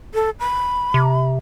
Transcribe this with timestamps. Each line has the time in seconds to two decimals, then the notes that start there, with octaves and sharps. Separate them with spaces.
0.14 A4
0.40 B5
0.94 C3